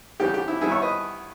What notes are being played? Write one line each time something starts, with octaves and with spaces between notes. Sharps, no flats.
E2 C#3 E3 G3 B3 G4
G4
E4
G2 D#3 G3 B3 E4 G#4
C#5 E5
B4 D#5